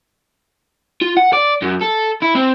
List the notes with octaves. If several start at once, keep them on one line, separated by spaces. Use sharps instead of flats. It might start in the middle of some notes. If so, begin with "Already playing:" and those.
F4
F#5
D5
F#2
A4
E4
C4